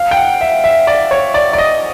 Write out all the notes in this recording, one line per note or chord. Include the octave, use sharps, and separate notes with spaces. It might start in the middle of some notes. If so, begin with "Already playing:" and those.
Already playing: F5
G5
F#5
E5
E5
D5
C#5
D5
D5
D#5